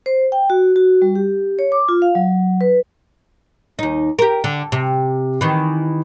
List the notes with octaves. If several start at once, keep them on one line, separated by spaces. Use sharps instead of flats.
C5
G5
F#4
F#4
G3
G4
C#5
D6
F4
F5
F#3
B4
D#2 D#4
G4 A#4
D3
C3
D#3 E3